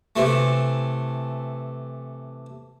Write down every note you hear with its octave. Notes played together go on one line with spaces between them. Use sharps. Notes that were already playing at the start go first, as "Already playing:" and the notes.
C3 E3 A3